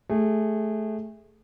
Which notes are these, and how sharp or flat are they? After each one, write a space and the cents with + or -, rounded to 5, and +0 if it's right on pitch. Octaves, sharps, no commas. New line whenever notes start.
A3 -15 G#4 -25